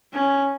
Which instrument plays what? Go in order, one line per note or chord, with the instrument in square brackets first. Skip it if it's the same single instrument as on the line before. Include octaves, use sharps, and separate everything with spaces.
[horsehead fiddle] C#4